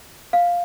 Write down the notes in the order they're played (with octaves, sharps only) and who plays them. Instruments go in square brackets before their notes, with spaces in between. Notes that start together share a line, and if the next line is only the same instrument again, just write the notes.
[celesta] F5